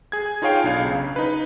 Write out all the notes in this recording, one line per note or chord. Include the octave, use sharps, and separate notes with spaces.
G#4 G#6
D#4 F4 G#4 C#5 F5 G5
B1 D4 F5
C#3
D#4 B4